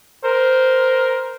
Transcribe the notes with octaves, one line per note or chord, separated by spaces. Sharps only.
A#4 C5